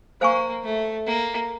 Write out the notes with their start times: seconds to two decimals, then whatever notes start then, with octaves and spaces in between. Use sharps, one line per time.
0.21 A#3 C5 F5 G#5 C#6
0.64 A3
1.06 A#3